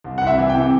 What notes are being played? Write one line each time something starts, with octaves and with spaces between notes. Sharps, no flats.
C2
C2 F#5
E5
E3
G5
C3